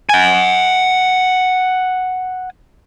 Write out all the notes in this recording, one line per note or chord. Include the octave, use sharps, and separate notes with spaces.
F#5 G#5